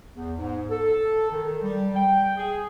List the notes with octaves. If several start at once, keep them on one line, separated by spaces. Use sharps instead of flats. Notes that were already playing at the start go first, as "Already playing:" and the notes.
E2
G#2
A4
D#3
G3
G5
G#4